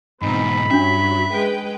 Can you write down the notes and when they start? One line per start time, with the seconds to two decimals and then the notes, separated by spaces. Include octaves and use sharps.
0.22 G#2 B2 E3 C4 D#4 B5
0.71 G2 F#3 C#4 D4 E5
1.32 G#3 B4 G5